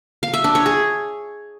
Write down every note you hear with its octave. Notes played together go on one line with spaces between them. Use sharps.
F5
E5
D4
C#5
G#4